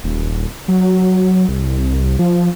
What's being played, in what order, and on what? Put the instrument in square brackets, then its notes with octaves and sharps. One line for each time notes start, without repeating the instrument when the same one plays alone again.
[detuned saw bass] D#1
F#3
C2
F3